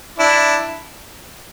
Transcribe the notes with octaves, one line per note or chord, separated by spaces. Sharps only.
D4 E4